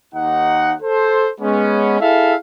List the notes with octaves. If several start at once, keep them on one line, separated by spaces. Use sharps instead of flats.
D#2 D#4 F#5
A4 C5
G#3 B3 C#4
E4 G#4 A4 E5 F5